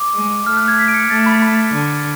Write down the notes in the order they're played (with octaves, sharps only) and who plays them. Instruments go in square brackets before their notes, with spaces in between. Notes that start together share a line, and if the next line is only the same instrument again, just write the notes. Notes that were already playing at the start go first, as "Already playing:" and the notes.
Already playing: [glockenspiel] D6
[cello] G#3
[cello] A3 [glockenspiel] F6
[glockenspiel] F#6
G#6
B6
D7
C#7
[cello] A3 [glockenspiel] A6
[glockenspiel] B5
B5
[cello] D3